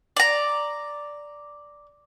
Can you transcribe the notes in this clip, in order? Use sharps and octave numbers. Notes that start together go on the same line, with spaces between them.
D5 A#5